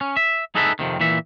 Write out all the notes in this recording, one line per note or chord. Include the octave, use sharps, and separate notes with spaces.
C#4
E5
D#4 G#4 A4 B4 D#5 E5
F2 C3 D#3
A#2 E3 E5